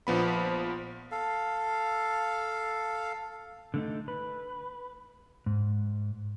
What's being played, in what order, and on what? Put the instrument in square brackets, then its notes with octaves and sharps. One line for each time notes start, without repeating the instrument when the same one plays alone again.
[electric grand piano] A#1 F3 B3 B5
[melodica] A4 F5
[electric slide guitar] D3 A3 D#4
B4
G#2